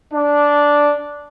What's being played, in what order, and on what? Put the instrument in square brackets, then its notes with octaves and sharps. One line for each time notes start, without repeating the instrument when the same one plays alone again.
[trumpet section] D4